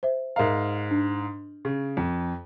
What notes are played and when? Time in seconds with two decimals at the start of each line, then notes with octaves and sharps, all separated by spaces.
0.03 C5 E5
0.36 G#2 A#4 E5 F5 A#5
0.91 D4
1.65 C#3
1.97 F2